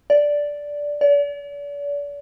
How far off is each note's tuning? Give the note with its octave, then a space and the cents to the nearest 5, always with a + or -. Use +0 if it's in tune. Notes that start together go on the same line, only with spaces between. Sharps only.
D5 -5
D5 -40